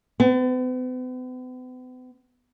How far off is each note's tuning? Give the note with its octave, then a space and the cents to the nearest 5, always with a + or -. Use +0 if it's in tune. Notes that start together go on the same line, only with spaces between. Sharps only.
B3 +45